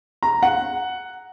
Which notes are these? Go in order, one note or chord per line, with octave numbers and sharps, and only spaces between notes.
A#5
F#5